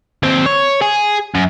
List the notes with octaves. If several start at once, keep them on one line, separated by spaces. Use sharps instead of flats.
D#2 C4
C#5
G#4
F#2